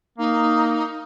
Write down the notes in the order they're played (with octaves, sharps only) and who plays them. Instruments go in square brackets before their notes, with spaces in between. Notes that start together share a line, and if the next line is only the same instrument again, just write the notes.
[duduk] A#3 [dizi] D#4